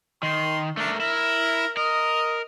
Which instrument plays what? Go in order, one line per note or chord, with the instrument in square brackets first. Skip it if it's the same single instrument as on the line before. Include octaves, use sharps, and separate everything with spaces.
[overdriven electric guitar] D#3 [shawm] C6
[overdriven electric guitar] A3 A#4 [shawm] D4
[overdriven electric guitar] E4 [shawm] A#4
[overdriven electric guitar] A#4 [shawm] D#5